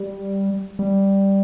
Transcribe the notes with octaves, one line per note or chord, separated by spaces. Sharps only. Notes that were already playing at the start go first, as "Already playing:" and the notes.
Already playing: G3
G3